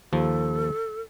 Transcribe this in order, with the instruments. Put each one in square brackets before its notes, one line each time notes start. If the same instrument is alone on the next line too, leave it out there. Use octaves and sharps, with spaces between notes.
[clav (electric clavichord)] D#2 F3 [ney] A4